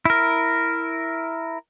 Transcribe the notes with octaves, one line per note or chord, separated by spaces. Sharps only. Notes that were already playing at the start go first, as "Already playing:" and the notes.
E4 A#4